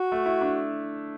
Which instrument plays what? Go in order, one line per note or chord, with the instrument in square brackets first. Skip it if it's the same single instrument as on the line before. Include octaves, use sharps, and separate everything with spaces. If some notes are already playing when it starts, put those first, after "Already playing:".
Already playing: [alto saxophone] F#4
[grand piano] A3
E4
D4